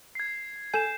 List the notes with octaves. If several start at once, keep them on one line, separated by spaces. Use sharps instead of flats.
G#6 C7
A4 G#5 G6 E7